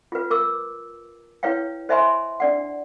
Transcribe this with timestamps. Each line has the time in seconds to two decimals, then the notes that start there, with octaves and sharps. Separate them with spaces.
0.12 F4 B4
0.30 A#4 D6 E6
1.43 E4 B4 C#5 F5 G5
1.89 C5 D#5 E5 G#5 B5 C6
2.40 D4 D5 F#5